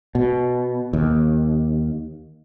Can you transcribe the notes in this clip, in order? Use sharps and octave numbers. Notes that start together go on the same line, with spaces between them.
B2
D#2